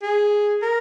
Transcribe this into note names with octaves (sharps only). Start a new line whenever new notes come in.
G#4
A#4